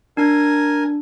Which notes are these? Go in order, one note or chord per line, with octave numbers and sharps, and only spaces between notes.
D4 A#4 G#5